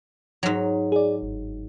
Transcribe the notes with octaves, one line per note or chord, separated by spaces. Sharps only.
G#2 F#3
G#4 D5
G1